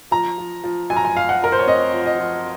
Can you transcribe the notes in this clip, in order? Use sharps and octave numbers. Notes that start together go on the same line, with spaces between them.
F3 A#5
F3
F3
F#2 G#5
A#5
G#5
F#2 F5
F#5
F#2 A#4
C5
C#5
C4 D#5
F3
D#5
F3